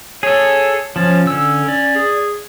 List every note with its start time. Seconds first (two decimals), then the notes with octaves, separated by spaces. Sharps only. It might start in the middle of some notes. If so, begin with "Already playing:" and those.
0.23 G#4 A4 C#5
0.96 F3 C#4 A5
1.26 D3 C#4 E6
1.68 D5
1.95 G#4